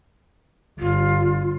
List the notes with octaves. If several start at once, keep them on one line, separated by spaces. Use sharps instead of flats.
G1 F4